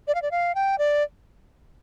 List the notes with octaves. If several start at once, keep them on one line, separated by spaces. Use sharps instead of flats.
D5
F5
D5
F5
G5
D5